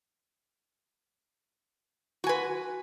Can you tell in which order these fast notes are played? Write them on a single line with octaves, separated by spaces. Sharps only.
F#4 G#5 B4